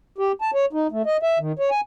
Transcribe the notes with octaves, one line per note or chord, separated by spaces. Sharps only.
G4
A5
C#5
D#4
A3
D#5
E5
D#3
C#5
G#5